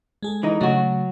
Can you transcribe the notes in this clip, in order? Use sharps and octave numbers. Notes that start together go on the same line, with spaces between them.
G#3 G#4 A4
E3 D#4
C#3 F#3 A3 F#4